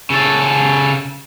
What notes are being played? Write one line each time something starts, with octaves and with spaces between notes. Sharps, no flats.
C#3 A4